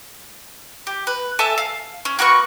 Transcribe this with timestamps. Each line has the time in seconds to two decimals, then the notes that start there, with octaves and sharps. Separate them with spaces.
0.87 G4
1.07 B4
1.39 A4 E5 G#5 A5
1.58 F5
2.05 C#4
2.19 A#3 F#4 B4 C#6